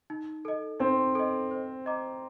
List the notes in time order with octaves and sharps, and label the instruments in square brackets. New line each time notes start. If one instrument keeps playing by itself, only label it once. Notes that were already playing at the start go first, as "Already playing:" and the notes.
[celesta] D#4
A4 D#5
[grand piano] C4 [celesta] D#4
[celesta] A4 D#5
C5
D#5 A#5 D6